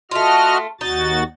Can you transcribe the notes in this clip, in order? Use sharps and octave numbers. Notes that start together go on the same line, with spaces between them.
A3 F4 F#4 D#5 F6
D#2 D#4 F#4 A6